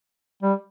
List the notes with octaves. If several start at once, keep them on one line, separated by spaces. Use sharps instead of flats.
G3